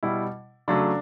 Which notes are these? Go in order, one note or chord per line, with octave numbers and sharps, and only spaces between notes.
B2 G3 E4
C#3 F#3 A3 D4